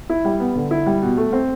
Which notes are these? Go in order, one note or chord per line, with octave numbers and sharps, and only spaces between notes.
E4
G3
B3
D3
E4
G3
B2
A3
C4